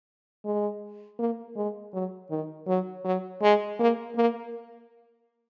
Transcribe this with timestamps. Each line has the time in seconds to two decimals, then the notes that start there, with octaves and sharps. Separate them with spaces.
0.45 G#3
1.19 A#3
1.56 G#3
1.93 F#3
2.31 D#3
2.67 F#3
3.04 F#3
3.42 G#3
3.80 A#3
4.16 A#3